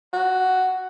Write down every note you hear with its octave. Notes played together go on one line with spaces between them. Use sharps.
F#4